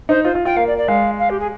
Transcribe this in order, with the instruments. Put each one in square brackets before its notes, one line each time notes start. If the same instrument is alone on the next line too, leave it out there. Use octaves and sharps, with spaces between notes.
[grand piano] D#4 [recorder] C5
[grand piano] F4 [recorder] C5
[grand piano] F4
[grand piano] F4 [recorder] G5
[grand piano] A#3 [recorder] F5
[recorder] D5
D5
[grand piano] G#3 [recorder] F5
[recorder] F5
G4
G#4